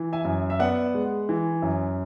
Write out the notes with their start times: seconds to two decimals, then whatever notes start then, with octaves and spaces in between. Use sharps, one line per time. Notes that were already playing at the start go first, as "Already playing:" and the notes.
Already playing: E3
0.12 E5 G#5
0.25 F#2
0.50 E5
0.59 B3 D5 F#5
0.94 G#3
1.29 E3
1.62 F#2